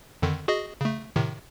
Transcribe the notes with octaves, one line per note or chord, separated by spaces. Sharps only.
F2 D3 D#3
F#4 G#4 D#5
C#3 A3
A2 C3 D#3